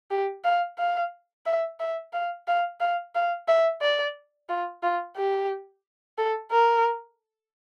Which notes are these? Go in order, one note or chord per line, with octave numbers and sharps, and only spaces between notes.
G4
F5
F5
E5
E5
F5
F5
F5
F5
E5
D5
F4
F4
G4
A4
A#4